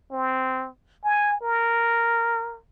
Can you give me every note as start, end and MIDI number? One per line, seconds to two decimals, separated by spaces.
0.12 0.69 60
1.04 1.38 80
1.41 2.58 70